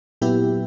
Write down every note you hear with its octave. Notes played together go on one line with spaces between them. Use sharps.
A#2 F#3 B3 E4 G4